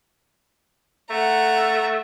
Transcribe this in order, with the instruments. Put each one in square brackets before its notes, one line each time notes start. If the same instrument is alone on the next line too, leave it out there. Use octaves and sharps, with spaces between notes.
[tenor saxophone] A3 [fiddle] F#5 A#5